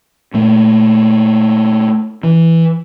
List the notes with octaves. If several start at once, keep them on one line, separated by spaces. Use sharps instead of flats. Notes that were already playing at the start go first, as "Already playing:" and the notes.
A#2 A3
E3